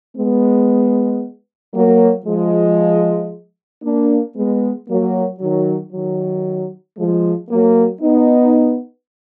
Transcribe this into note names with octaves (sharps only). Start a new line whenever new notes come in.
G#3 B3
F#3 A#3
F3 G#3
A#3 D4
G#3 B3
F#3 A#3
D#3 F#3
D#3 F#3
F3 G#3
F#3 A#3
B3 D#4